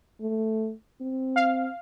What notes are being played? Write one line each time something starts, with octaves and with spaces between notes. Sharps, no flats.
A3
C4
F5